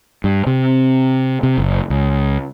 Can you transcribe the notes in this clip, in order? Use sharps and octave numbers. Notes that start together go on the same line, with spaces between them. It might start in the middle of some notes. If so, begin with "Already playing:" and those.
G2
C3
C3
F#1
C#2